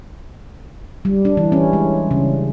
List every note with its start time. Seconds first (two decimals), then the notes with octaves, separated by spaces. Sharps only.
1.05 G3
1.25 D4
1.37 E3
1.52 C#4
1.73 G#3
2.11 C#3